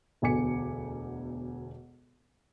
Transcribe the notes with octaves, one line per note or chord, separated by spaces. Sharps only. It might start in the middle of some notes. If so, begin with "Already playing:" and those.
E1 D2 B2 G#5 D6 C#7